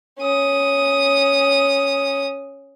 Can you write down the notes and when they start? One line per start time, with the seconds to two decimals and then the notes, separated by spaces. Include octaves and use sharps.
0.19 C#4 D#6